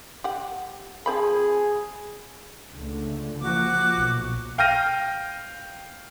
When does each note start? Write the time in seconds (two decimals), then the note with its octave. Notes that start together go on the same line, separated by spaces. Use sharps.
0.24 G4 F#5
1.06 F3 C4 G#4 B5
2.75 C#2 D3 A3
3.41 F3 A#3 F#4 D6
3.95 B1 A#2
4.58 F5 G5 F6 G6 A#6 D#7